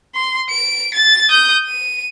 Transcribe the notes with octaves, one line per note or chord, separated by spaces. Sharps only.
C6
D7
A6
D#6 G6
D#7